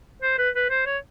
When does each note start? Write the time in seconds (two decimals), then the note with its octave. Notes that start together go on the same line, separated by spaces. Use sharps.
0.22 C5
0.38 B4
0.55 B4
0.70 C5
0.86 C#5